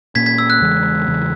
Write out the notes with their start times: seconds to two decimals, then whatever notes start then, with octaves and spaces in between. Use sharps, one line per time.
0.15 A#2 A#3 C#4 G#6 B6
0.26 G#6 B6
0.38 E6
0.50 F#6
0.61 E2 C#3 E3 G#3
1.08 E2 C#3 E3 G#3